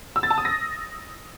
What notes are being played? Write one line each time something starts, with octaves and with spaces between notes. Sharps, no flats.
E6
A6
A5
D#6
A#6